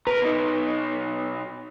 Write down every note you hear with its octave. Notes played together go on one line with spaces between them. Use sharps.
A#4 B4 A#5
B2 D#4